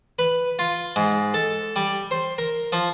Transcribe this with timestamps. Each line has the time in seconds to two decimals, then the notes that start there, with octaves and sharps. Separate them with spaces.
0.19 B4
0.59 F4
0.96 G#2
1.34 A4
1.76 G3
2.11 C5
2.38 A#4
2.72 F3